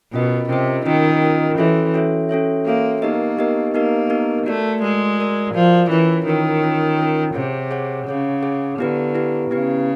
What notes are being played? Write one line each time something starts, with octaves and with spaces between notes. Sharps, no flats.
B2 C#4 F4 A#4 D#5
C3 C#4 F4 A#4 D#5
D#3 C#4 F4 A#4 D#5
C#4 F4 A#4 D#5
E3 C#4 F#4 A4 C#5 E5
C#4 F#4 A4 C#5 E5
C#4 F#4 A4 C#5 E5
A#3 C#4 F#4 A4 C#5 E5
A#3 B3 D#4 G4 A#4 D#5
B3 D#4 G4 A#4 D#5
A#3 B3 D#4 G4 A#4 D#5
B3 D#4 G4 A#4 D#5
A3 F#4 A#4 D5
G#3 F#4 A#4 D5
F#4 A#4 D5
F3 F#4 A#4 D5
E3 C#4 F4 A#4 C#5
D#3 C#4 F4 A#4 C#5
C#4 F4 A#4 C#5
C#4 F4 A#4 C#5
C3 G#4 C#5 F#5
G#4 C#5 F#5
C#3 G#4 C#5 F#5
G#4 C#5 F#5
D3 B3 E4 G4 B4
B3 E4 G4 B4
C#3 B3 E4 G4 B4